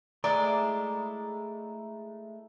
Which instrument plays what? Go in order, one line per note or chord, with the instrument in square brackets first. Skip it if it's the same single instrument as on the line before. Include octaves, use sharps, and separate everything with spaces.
[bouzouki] G#3 E4 G#4 [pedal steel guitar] A3 [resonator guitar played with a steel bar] D5 [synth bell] A#5